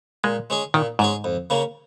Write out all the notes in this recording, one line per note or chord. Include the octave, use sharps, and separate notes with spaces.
A#2 G#3
G#3 C#4 G#4
A#2 D#3
G#2 G#3 C#4 G#4
F2
C#3 A#3 C#4